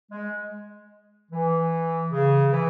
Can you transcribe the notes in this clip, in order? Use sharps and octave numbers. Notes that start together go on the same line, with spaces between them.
G#3
E3
C#3
E3